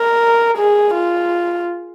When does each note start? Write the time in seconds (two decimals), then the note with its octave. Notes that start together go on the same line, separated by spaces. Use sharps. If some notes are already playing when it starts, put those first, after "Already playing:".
Already playing: A#4
0.57 G#4
0.94 F4